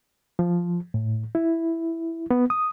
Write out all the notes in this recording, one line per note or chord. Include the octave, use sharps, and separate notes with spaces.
F3
A2
E4
B3
D#6